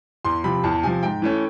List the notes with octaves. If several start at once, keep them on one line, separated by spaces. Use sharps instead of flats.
E2 C6
C3 F3 B5
E2 A5
C3 F3 G#5
G#2 G5
E3 A3 C#4